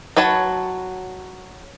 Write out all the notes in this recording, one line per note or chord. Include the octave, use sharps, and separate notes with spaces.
F#3 B4 C#5 A5